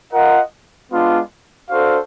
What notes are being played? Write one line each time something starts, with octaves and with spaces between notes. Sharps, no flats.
F4 A#4 D#5 F#5
G#3 B3 D4 F4
D4 F#4 A4 C5 F5